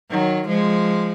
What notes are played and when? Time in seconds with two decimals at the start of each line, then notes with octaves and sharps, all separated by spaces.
0.11 D#3 F#3
0.48 F3 G#3